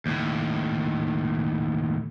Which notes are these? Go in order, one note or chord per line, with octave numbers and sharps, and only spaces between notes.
D#2 A2